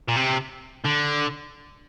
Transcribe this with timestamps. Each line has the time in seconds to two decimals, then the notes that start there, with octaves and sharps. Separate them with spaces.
0.08 A#2
0.16 C3
0.84 D3